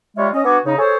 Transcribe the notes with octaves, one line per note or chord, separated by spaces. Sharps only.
G3 G#3 F4 C#5 E5
C#4 D#5
B3 D4 F#4 G#5 D6
C#3 D#4
G#4 A4 C5 C#5